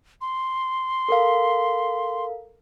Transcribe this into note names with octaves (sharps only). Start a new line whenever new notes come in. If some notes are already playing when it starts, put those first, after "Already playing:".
C6
A4 A#4 F5